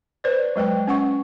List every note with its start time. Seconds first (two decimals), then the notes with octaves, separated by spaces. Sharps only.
0.24 B4 C5 D5
0.56 F#3 G#3 B4 G5
0.87 C#4 F#5 C#6